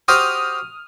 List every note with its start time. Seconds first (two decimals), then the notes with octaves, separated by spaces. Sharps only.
0.08 F#4 G4 C5 D#6 F6